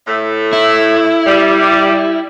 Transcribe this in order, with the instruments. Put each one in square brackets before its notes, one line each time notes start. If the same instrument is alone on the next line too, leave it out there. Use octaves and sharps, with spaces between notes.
[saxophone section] A2 A3
[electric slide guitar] E4
[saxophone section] G3